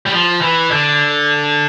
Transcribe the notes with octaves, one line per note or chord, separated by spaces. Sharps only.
G3
F3
E3
D3